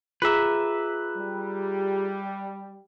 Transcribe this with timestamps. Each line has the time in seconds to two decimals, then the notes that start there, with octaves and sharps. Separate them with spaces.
0.22 F4 G#4 B4 E5 A#5
1.17 G3